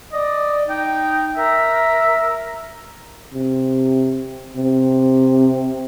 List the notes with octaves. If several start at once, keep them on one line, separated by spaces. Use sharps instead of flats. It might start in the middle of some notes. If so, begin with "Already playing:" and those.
D5 D#5
D#4 G5
A#4 E5
C3
C3